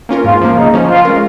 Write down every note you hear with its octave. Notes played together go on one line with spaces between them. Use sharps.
A#3 C#4 F4 A#4
G#2 F4
F3 A#3
C#3 D#4
F3 C#4
F3 F4
G#3 C#4 A#4